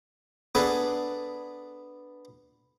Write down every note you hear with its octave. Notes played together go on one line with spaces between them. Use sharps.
B3 D4 G#4 A4 B4